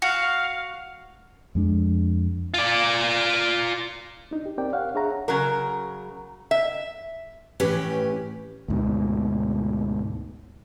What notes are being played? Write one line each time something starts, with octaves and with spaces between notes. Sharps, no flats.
F#4 F5
F2 G#3 D4
F4 D5
D4 D#4
G4
C4 G4 A#4 D5 G5
C#5 F5 F#5
D4 G#4 C#5 E5 F#5 A#5
C#3 F#3 A#4
E5
A2 E3 C#4 G4 B4
D2 G#2 B2